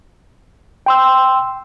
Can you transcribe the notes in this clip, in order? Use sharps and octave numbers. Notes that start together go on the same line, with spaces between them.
G5 C6 E6